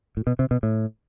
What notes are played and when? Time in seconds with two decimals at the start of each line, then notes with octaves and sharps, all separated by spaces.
0.17 A2
0.27 B2
0.39 C3
0.51 B2
0.63 A2